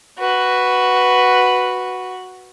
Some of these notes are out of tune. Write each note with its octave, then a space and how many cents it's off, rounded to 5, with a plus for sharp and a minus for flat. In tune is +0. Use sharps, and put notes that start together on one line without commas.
F#4 +0 B4 +0